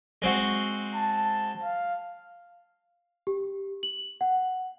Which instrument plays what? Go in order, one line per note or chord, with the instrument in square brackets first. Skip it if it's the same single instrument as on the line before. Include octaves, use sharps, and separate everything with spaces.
[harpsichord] G#3 C4 F#4
[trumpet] A5
F5
[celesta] G4
F#7
F#5